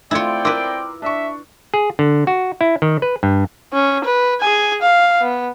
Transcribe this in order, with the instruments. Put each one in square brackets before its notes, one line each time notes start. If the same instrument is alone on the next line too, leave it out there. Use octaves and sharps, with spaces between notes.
[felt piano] A3 G#6 C#7 [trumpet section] C4 D5 G5 [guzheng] E4 F4
[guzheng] E4 B4 [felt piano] A#4 C6 D6
[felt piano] D4 C#6 [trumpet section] E5
[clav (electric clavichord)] G#4
D3
F#4
E4
D#3
B4
G2
[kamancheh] C#4
B4
G#4 G#5
F5
B3